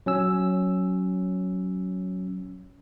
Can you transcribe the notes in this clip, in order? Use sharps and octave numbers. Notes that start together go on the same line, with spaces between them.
F#3 C#4 E6